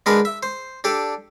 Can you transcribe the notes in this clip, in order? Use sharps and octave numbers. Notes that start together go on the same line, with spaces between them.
G#3 B3 D4 A#4 B4 D#5
E5
C5
D4 G4 A4 D5